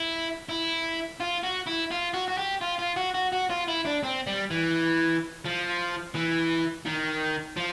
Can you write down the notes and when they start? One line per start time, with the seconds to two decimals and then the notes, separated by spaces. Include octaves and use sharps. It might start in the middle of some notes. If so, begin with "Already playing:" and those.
Already playing: E4
0.49 E4
1.20 F4
1.43 F#4
1.67 E4
1.91 F4
2.14 F#4
2.28 F#4
2.38 G4
2.61 F4
2.79 F4
2.96 F#4
3.14 F#4
3.32 F#4
3.50 F4
3.68 E4
3.85 D4
4.03 C4
4.27 G3
4.51 E3
5.45 F3
6.15 E3
6.86 D#3
7.56 F3